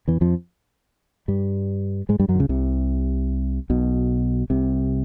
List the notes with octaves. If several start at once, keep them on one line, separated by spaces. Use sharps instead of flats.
E2 E3
F2 F3
G2 G3
G#2 G#3
G2 G3
F#2 F#3
D3
C#2 C#3
C2 C3
B1 B2
C2 C3